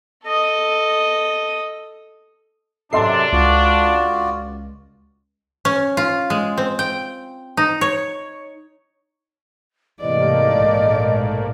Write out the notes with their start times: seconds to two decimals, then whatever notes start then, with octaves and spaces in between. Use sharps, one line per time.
0.24 A4 D#5
2.93 F#2 C3 F#3 D4 A4 E5 C6 C7
3.33 C#2 F4 F#4 D5
5.65 C#4
5.97 F4
6.30 G#3
6.57 C4
6.79 G5
7.57 D#4
7.81 C#5
10.01 G#2 C3 E3 A3 A#3 D5 D#5
10.60 A#1 B2